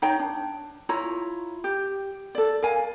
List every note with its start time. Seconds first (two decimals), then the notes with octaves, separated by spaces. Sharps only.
0.02 D#4 C#5 G5 A#5
0.19 D4
0.89 E4 F4 C#5 A#5
1.64 G4
2.35 A4 D5
2.62 A#4 F5 G#5